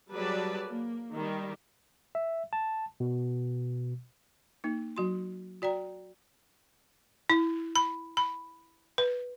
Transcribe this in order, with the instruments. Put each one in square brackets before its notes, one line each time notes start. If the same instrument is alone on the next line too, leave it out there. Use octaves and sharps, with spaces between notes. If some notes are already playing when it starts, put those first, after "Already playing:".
[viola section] F#3 G3 G#4 B4 D5 A5
A#3
D#3 G3
[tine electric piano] E5
A5
B2
[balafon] A#3 D#4
F#3 F#4 C6
F#4 D5 G5 A#5
E4
B5
B5
B4